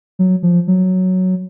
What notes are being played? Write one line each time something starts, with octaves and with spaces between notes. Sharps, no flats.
F#3
F3
F#3